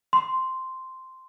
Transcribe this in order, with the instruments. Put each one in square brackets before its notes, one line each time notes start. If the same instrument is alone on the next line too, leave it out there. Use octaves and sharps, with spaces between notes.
[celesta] C6